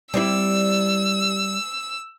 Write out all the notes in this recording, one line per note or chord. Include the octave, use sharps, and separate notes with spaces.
G3 C4 E4 E6